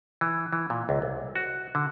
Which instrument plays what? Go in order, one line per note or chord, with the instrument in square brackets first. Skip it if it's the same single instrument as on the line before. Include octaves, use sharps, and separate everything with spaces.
[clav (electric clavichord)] E3
E3
A#2
C#2
C2
F#4
D3